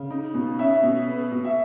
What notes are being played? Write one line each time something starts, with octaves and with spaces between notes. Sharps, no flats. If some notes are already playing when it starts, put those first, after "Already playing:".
Already playing: C#3
D#4
B2
C#4 E5
B2
B3
B2
E5